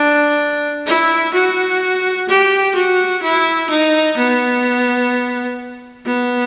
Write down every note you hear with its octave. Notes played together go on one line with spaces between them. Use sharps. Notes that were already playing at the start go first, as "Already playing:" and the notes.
Already playing: D4
E4
F#4
G4
F#4
E4
D#4
B3
B3